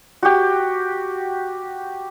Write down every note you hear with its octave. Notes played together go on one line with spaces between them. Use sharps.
F#4 G4